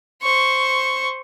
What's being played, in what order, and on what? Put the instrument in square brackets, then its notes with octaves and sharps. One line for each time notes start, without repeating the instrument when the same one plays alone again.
[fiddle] C5 C#6